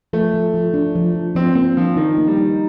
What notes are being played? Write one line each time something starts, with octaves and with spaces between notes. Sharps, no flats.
F3 A3
F3
F3
D4
F3
F3
F3 C4
A#3 C4
F3 D4
D#3 D#4
A#3
G3
D#4